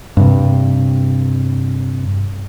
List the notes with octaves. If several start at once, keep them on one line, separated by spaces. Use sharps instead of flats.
G2 C3